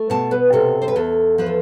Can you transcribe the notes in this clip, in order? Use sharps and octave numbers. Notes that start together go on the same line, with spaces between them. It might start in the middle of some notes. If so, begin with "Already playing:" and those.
Already playing: A3
B2 A5
B4
C3 A4
C5
B4
E2 A4
F3 B4
A4